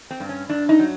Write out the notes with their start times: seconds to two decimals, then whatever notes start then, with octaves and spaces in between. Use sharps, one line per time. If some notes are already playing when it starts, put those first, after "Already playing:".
0.11 C4
0.20 G2
0.29 C#4
0.49 G2 D4
0.69 D#4
0.79 F#3